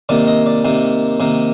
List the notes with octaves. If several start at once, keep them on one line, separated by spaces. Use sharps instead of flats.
C3 D#3 A#3 D5
D#5
D5
C3 D#3 A#3
C3 D#3 A#3